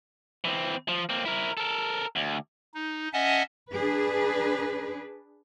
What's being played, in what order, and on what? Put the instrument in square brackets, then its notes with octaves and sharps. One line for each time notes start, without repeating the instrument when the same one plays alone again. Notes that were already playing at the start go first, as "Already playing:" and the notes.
[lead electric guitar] E3 C4
F3
A#3 C4
E4 A#4
A4 A#4
D2
[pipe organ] D#4
C#4 D#5 E5 F#5 G#5 A5
[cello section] D4 G#4 B4